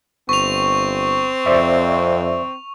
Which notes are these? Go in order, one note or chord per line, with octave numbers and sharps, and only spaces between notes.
G1 C4 C#6 F7
F2 C5 D5 E5